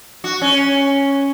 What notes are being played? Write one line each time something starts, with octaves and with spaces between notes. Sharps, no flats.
F#4
C#4